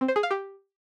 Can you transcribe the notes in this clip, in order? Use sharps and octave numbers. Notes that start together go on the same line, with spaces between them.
C4
C5
G#4
F5
G4